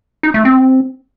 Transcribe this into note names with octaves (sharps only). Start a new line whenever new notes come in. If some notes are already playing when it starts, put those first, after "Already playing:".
D#4
A3
C4